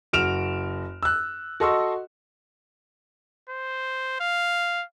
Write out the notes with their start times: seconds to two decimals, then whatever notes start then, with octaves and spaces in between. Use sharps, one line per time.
0.13 F#1 F#4 F6 D7 E7 F7
1.03 E6 F#6
1.60 F#4 A4 D#5 C6 C#6 E6
3.50 C5
4.20 F5